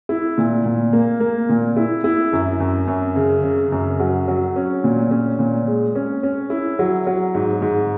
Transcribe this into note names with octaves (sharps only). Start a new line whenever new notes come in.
E4
A#2
A#2
A#3
A#3
A#2
E4
E4
F#2
F#2
F#2
C#3
C#3
F#2
F#3
F#3
C#4
A#2
C#4
A#2
G#3
C#4
C#4
E4
F#3
F#3
G#2
G#2